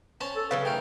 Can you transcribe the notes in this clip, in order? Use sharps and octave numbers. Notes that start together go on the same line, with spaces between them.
C#4 C5 A5
A4
C#3 E3 F#3 B4 C#5 F5
A3 D#4 A#4 G5